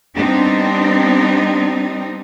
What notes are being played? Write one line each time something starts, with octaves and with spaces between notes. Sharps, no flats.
G3 B3 C4 D4 D#4